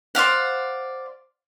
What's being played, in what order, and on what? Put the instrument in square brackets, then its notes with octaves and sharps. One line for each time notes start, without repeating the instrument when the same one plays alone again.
[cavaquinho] C5 D5 F5 F#5